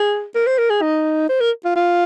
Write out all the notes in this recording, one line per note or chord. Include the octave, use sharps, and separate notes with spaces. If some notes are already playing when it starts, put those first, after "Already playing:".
Already playing: G#4
A#4
C5
A#4
G#4
D#4
C5
A#4
F4
F4